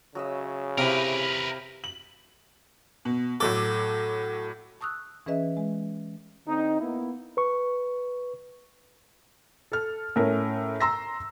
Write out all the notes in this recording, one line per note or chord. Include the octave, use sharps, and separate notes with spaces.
C#3 F#3 D#5 E5
C3 E4 G4 A#4 B4 F5
F#7
B2
A2 F#3 A4 D6
A5 C#6 D#6 E6 F#6
E3 C#4 G#4 B4 D#5 E5
G#3
D3 C4 D#4
A#3 B3 E4
B4 C#6
A4 F6
A2 C#4 A#4
A#5 C6 E6 A#6